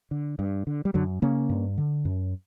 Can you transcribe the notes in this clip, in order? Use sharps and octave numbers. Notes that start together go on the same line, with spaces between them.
D3
G2
D3
G3
F#2 D3 F#3
C#3 A#3 C#4
G2
D3
F#2